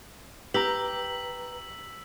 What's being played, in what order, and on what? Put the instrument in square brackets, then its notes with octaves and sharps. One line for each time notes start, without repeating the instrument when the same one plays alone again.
[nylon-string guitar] G4 [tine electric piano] B4 A#5 [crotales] E6 B6 F#7